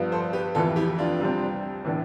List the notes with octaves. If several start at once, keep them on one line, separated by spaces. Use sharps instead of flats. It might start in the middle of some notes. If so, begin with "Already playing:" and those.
Already playing: G2 F3 B3
A4 C5
G4 B4
F1 F2 E3 F4 A4
E4 G4
D4 F4
C2 C3 G3 C4
A2 E3 B3 D4